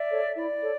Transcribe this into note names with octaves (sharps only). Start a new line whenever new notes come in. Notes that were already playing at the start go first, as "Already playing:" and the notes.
Already playing: D5 E5
A4 C#5
E4 D5
A4 C#5